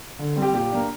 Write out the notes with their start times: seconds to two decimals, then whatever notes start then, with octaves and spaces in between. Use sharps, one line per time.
0.19 D3
0.36 G3 C4
0.42 G4
0.53 A#2 G4
0.71 A#3 D4